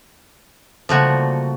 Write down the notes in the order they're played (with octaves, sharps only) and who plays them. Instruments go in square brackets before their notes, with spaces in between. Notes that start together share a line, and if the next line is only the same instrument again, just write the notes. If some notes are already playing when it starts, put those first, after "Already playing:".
[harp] C#3 G3 A#3 [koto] F3 A3 F#4